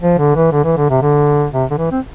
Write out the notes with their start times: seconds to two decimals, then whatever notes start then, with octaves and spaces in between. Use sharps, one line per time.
0.02 F3
0.18 D3
0.36 E3
0.52 D3
0.65 E3
0.77 D3
0.90 C3
1.02 D3
1.54 C3
1.70 D3
1.78 E3
1.92 C4